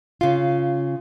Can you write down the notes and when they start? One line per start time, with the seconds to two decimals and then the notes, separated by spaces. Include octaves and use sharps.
0.21 C#3 F4